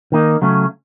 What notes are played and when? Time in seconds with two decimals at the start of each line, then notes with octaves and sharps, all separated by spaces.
0.12 D#3 A#3 D#4
0.42 C#3 F#3 A3 C#4